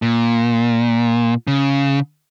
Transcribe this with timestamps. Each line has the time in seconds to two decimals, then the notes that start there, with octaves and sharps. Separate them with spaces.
0.02 A#2
1.47 C#3